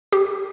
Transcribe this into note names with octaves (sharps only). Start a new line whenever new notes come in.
G4